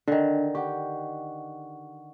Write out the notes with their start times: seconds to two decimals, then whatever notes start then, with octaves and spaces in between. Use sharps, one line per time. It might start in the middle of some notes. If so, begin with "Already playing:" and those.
0.08 D3 D#3 D4
0.55 G4 F#5 C#6